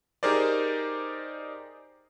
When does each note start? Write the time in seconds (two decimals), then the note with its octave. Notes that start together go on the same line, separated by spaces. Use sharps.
0.23 D#4 G4 G#4 A#4 C5 D5